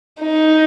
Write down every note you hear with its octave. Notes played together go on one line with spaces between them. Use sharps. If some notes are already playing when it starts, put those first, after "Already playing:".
D#4